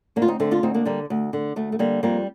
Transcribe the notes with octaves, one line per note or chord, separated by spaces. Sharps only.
D2 A#3 D4
F4
C4 D#4
D3 A3 C4
D4 F4
D2 C4 D#4
A#3 D4
D3 G3 A#3
D2
D3
D2 A3
A3
D3 G3 A#3
F2 G3 A#3